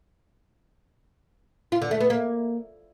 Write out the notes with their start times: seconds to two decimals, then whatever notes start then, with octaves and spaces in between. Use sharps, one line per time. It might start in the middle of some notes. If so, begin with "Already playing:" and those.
1.72 F4
1.82 D3
1.91 A3
2.01 B3
2.10 A#3